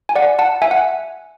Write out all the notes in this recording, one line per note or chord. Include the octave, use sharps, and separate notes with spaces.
G#5
D5 F#5
F#5 A5
E5 G#5
F#5